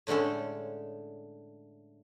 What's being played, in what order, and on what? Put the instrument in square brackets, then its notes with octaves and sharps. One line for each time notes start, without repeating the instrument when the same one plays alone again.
[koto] A2 D3 G#3 C#4 A4